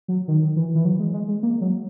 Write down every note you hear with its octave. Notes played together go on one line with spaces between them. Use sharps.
F#3
D#3
E3
E3
F#3
G#3
G#3
G#3
A#3
F#3